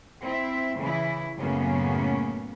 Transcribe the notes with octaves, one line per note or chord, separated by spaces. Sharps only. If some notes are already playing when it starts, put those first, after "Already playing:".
C4 E4 E5
C#3 E3 E4
F#2 A2 C#3 A#3 B3 C#4